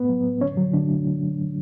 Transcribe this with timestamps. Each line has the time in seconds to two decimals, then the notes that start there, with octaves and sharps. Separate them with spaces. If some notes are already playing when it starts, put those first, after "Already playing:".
Already playing: A2 A3 B3 B4
0.09 F#3
0.25 A2
0.41 D3 C#4 C#5
0.57 D3 F#3 F#4
0.73 D3 A3 D4
0.90 A3